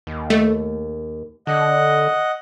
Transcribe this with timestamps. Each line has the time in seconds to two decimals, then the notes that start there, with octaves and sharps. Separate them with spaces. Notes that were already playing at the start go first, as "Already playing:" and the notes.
0.07 D#2
0.30 A3
1.47 D3 D#5 F#5